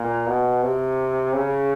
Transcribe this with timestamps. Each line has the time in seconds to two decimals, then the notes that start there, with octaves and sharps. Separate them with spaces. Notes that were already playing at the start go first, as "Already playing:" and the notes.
Already playing: A#2
0.27 B2
0.62 C3
1.33 C#3